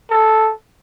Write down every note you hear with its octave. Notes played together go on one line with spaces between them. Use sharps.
A4